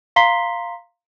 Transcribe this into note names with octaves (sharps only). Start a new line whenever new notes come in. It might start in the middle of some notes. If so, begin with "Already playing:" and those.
F5 A#5 C6 B6 C7 G7